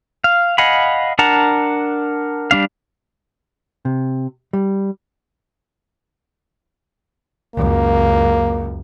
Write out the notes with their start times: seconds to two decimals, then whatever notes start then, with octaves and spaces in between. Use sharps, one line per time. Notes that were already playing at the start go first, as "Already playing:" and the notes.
0.24 F5
0.58 D#5 F5 F#5 G#5 B5
1.19 D4 A#4 F#5 A5 A#5
2.51 G3 D4 F5
3.85 C3
4.53 G3
7.56 C#2 F#2 A#3